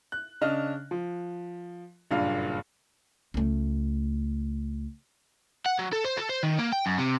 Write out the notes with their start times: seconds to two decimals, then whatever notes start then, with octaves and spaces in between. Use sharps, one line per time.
0.12 F#6
0.41 C#3 D4 D#5 F6
0.91 F3
2.11 F#1 G2 A#2 F5
3.34 C#2 A3
5.66 F#5
5.79 F#3
5.93 A4
6.04 C5
6.17 A4
6.29 C5
6.43 D#3
6.59 A#3
6.73 G5
6.86 F#2
6.98 C3